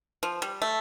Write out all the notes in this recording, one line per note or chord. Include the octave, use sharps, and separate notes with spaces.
F3
G3
A3